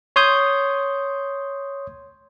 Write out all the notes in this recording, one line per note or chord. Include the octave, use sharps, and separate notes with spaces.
C#5 C6 D#6 G6